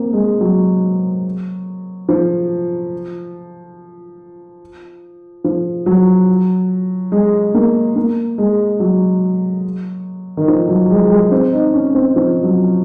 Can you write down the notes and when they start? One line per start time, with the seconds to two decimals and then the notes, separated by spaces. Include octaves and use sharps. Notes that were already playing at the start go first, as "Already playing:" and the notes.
Already playing: A#3 C4
0.13 G#3
0.41 F#3
2.09 F3
5.44 F3
5.86 F#3
7.12 G#3
7.55 A#3
7.96 A#3
8.38 G#3
8.80 F#3
10.37 D#3
10.48 F3
10.68 F#3
10.90 G#3
11.10 G#3
11.31 C4
11.52 D#4
11.74 C#4
11.95 C4
12.16 F3
12.43 F#3